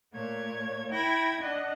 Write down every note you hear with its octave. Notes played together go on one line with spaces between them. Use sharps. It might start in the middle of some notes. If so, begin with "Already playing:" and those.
A#2 A3 C#5 G#6
E4 G5 B5 G#6 A#6
D4 D#5 F#5